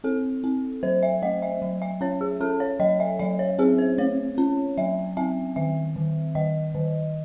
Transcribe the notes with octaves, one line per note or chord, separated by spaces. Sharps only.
C4 A4
C4
F#3 C5
E5
A3 D#5
E5
F#3
E5
C#4 C#5
G#4
C#4 A4
C#5
F#3 D#5
E5
F#3 E5
C#5
C4 G#4
C5
A3 C#5
C#4
F#3 E5
C4 E5
D#3 E5
D#3
D#3 D#5
D#3